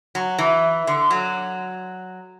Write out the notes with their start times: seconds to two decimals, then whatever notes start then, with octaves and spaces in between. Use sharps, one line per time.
0.15 F#3
0.38 E3
0.87 D3
1.11 F#3